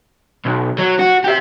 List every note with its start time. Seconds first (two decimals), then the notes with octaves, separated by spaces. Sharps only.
0.46 B1
0.79 F#3
0.99 F#4
1.24 G4 E5